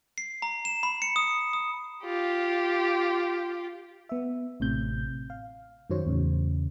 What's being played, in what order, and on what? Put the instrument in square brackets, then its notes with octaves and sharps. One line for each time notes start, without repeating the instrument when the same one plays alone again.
[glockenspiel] C7
A#5
E7
B5
C#7
D#6
D#6
[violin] F4 G4
[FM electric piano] B3 E5
A1 A2 C3 G6
F5
F#2 D#3 F#3 C5 C#5
E2 A2 C#3